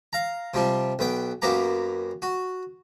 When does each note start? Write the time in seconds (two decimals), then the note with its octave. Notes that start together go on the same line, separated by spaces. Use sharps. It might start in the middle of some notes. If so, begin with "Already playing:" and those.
0.13 F5 A#5
0.54 C3 F3 G3
0.99 B1 B3 G5
1.42 F#2 A#3 B3 G4 A#5
2.22 F#4